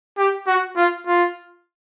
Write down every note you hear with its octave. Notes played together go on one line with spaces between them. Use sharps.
G4
F#4
F4
F4